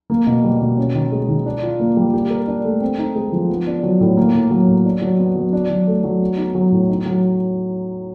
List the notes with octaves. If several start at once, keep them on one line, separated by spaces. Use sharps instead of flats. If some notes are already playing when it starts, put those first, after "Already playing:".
A#3
B2
G3
B2
C#4
D#3
G#3
D#3
D4
F4
A#3
G3
G4
A#4
D4
A3
C4
D#4
G#3
F3
B3
D4
F#3
A2
A#3
A2
F#3
A2
D4
F#3
B3
F#3
D4
F#3
A3
F#3
B3
D#4
F#3
A2
D#4
F#3